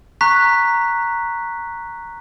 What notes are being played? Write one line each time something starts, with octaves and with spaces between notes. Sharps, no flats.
A#5 C#6 F#6 B6